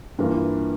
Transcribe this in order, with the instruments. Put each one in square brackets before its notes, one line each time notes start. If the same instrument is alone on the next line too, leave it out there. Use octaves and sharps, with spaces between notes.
[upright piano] G2 E3 A#3 F4